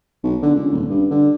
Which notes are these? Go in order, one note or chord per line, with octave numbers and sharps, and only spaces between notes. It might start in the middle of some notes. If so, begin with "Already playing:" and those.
B1
D3
C#2
D#1
G2
D3